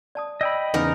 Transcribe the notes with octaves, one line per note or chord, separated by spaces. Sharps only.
D5 A5 D#6
D5 D#5 G5 B5 E6
E2 C#3 D#4 A#4